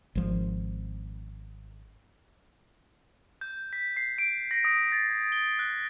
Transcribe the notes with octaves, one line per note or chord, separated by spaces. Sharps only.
G#1 F3
G6
B6
C7
D7
A#6
D#6
A6
G#6
G7
F#6